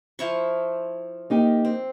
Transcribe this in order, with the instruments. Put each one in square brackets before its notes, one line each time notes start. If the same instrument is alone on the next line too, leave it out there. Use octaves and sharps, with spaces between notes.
[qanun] F3 E4 C#6
[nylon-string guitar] A#3 D#4 G4
[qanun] C4